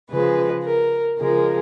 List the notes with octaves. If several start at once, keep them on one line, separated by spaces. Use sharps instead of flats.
C#3 F3 G#3 B4
A#4
C#3 F3 G#3 A#4